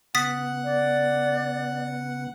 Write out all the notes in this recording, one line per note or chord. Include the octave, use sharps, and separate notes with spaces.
C#3 B3 F#5 D#6 A6 B6
D5